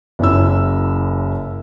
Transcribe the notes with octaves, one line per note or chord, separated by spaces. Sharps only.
F#1 F#2 E4 E6